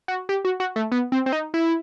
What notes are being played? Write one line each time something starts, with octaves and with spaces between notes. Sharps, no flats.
F#4
G4
F#4
F#4
A3
B3
C4
C4
D#4
E4